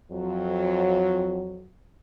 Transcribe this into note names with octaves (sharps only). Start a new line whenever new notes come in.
F2 F#3